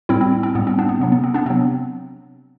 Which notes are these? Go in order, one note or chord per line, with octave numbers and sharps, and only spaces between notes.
A2 G3 C4 E4
C4
C4
A2 G3 B3
C4
B3 D4
B3
C3 F#3 B3
B3
C4
B3 D4
C3 F#3 C4